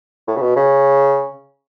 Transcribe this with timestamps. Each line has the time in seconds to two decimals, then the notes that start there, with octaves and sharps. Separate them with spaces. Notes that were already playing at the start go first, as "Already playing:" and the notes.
0.27 A2
0.37 C#3
0.41 B2
0.56 C#3